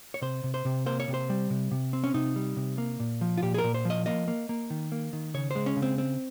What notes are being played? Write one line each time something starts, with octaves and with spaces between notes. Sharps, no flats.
C#5
C3 C5
C3
C5
C3
A#3 C5
C#5
C3
C5
G3
C3
C3
C4
C#4
C3 D#4
G3
C3
A#3
A#2
F3
F4
A#2 G4
G#4
A#4
A#2
C5
F3
D#5
A#3 D#5
A#3
A#3
D#3
A#3
D#3
C#3 C#5
G#3 C5
C#4
C#3
C4
C4